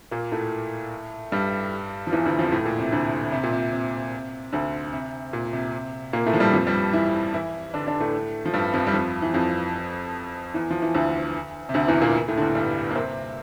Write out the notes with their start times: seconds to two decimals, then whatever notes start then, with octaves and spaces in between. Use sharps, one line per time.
0.12 A#2 A#3
0.32 A2 A3
1.32 G2 G3
2.07 F3
2.12 E2 E3
2.25 D2 D3
2.39 F2 F3
2.52 A2 A3
2.66 A#2
2.79 C3
2.92 D2 D3
3.32 C3
3.43 A#2
3.52 C3
3.72 C3
4.52 D2 D3
4.93 C3
5.33 A#2
5.53 C3
6.13 A#2 A#3
6.26 A2 A3
6.34 F3
6.40 G2 G3
6.53 F2 F3
6.66 G2 G3
6.93 E3 E4
7.34 E3 E4
7.74 D3 D4
7.87 D3 D4
8.00 A2 A3
8.46 F3
8.54 G2 G3
8.74 F2 F3
8.87 G3
8.94 F2 F3
9.22 E3
9.34 F2 F3
10.54 E2 E3
10.71 F3
10.82 E3
10.95 D2 D3
11.69 C3
11.74 D2 D3
11.88 E2 E3
12.01 A#2 A#3
12.28 A2 A3
12.37 D3
12.42 E2 E3
12.55 G2 G3
12.91 A#3
12.95 C3 C4